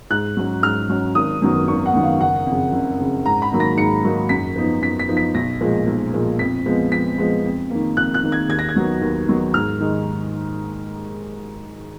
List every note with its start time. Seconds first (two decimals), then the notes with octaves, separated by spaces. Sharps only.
0.10 G#2 F#6
0.37 F#3 C#4
0.62 G#2 F6
0.89 F#3 C#4
1.15 G#1 D#6
1.42 F#2 D#3 F#3 B3
1.68 G#1 C#6
1.86 F#5
1.94 F#2 D#3 F#3 B3
2.03 F5
2.20 F#1 F#5
2.47 F2 C#3
2.72 F#1
2.99 F2 C#3
3.25 G#2 A#5
3.42 B5
3.51 D#3 F#3 A#3 D#4
3.60 A#6
3.77 G#2 C#7
4.04 D#3 F#3 A#3 D#4
4.29 F#2 B6
4.56 F3 B3 D#4
4.82 F#2 B6
4.99 B6
5.08 F3 B3 D#4
5.17 B6
5.35 B1 A#6
5.61 A#2 F3 G#3
5.87 B1
6.14 A#2 F3 G#3
6.39 F2 B6
6.66 F3 G#3 B3
6.91 F2 B6
7.18 F3 G#3 B3
7.44 F2
7.70 D#3 A#3
7.97 F2 F#6
8.14 F#6
8.23 D#3 A#3
8.32 G#6
8.49 D#2 G#6
8.59 A#6
8.69 G#6
8.75 D#3 F#3 B3 D#4
9.01 D#2
9.28 D#3 F#3 B3 D#4
9.54 G#2 F6
9.80 D#3 G#3 D#4